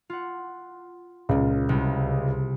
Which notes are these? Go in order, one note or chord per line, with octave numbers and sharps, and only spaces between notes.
F4 F#5
C#2 A#2 C#3
C2 C3 A3